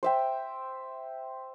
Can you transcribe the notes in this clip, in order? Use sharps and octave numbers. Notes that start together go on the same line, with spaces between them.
C5 E5 G5